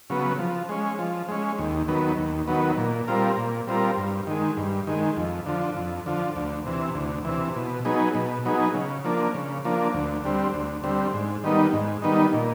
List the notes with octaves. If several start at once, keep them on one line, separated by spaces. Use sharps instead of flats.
C#3 F#3 B3
F3
G#3 C#4
F3
G#3 C#4
D#2
D#3 F#3 B3
D#2
D#3 F#3 B3
A#2
G3 C4 F4 A#4
A#2
G3 C4 F4 A#4
G2
D#3 G#3
G2
D#3 G#3
F2
D3 F3
F2
D3 F3
D2
C3 E3
D2
C3 E3
B2
F#3 B3 D#4 G#4
B2
F#3 B3 D#4 G#4
C#3
F3 A#3 D4
C#3
F3 A#3 D4
D2
D3 G3 C4
D2
D3 G3 C4
G#2
D#3 G3 B3 D#4
G#2
D#3 G3 B3 D#4
A#2